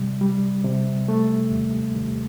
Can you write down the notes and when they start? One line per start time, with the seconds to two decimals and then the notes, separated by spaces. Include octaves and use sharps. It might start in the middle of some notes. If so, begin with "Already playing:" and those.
Already playing: C3 G3
0.21 G3
0.64 C3
1.08 A3
1.51 D#2
1.95 D#2